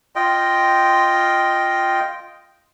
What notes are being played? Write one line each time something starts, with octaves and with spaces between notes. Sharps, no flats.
F4 D#5 G5